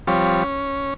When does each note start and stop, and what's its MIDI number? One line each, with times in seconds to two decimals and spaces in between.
0.07 0.43 53
0.07 0.43 55
0.07 0.43 60
0.07 0.43 73
0.44 0.94 61